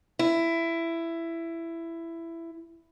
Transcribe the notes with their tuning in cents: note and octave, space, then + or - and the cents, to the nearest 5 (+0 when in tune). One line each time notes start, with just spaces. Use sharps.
E4 +15